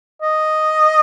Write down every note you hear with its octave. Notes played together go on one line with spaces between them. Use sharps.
D#5